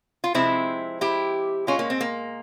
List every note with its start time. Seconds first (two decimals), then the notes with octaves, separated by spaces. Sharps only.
0.24 F4
0.34 C3 F3 G#3 C4 E4
1.01 E4 G4
1.67 A#2 G#3 C#4 F4
1.79 A#3 C#4
1.90 C4
2.01 A#3